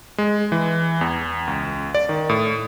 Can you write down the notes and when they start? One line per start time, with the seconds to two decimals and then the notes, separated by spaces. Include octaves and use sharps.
0.18 G#3
0.52 E3
1.01 E2
1.47 C#2
1.95 D5
2.09 D#3
2.29 A2